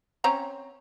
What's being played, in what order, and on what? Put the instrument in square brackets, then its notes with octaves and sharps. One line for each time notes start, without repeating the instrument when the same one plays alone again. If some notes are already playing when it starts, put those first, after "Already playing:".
[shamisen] C4 C#4 A#5